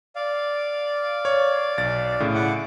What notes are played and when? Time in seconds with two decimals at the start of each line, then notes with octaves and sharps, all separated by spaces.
0.16 D5 F5
1.25 C#5
1.78 B1 A6
2.20 A2 C#3
2.35 E4 F#5 D6